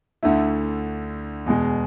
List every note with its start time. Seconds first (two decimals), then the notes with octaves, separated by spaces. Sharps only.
0.23 D2 D3 A3 E4
1.46 E2 B2 G#3